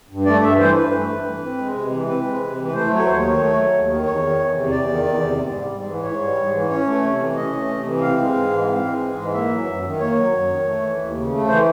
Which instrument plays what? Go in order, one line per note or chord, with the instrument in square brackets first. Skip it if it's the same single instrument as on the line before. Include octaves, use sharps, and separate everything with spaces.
[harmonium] G2
A3 D5
G2 E5
E3 C5
G2 B4
A3
G2
E3
C4
G#3
C3
E3
C4 B4
G#3
C3
E3
B4
A3 C5
F#3
C#5
D#2 C5
C#5
D#3
A3
F#3
D#2
D#3
E2 C#5
D#3
E2
C3
E2 D5
D#3
E2
C3
G#2
G3
G#2
E3
G#2 C#5
G3
G#2
E3
C#4 C#5
A3
C3
E3
C#4 D#5
A3
C3
E3
C4 F5
G#3
G#2
E3
C4
G#3
G#2
E3
A#3 E5
F#3
F#2
D#3
A#3 C#5
F#3
F#2
D#3
A3
E3
D#2
C#3
A3
E3 C5